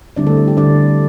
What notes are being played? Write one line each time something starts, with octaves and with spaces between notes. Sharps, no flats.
D3 G3 C4 D4 E4 D5
A3 A4
E4
G4
D3 G3 D4 D5